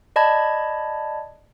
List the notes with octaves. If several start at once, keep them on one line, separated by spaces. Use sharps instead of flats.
D5 D#5 A5 B5 G#6